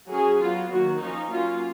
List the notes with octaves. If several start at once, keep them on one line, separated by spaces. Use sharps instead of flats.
F#3 C#4 G#4
F#3 B3 F4
D#3 F#3 A#3 F#4
F3 A#3 C#4 D#4
F#3 A#3 C#4 F4